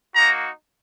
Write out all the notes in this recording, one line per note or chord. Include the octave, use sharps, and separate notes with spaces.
A#3 D#4 F#4 A#5